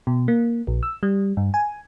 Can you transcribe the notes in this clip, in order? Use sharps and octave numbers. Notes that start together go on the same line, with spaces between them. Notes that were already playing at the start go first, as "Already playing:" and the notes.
B2
A#3
A#1
E6
G3
G2
G#5